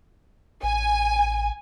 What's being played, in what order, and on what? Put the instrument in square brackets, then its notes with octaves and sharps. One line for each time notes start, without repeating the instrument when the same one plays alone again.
[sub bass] A1 [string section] G#5